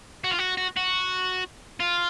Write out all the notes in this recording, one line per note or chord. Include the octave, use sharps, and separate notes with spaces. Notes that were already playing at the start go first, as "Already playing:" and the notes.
F#4
F4
F#4
F#4
F#4
F4